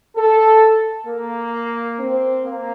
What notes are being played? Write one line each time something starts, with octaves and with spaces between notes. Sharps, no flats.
A4
A#3
C4
A#3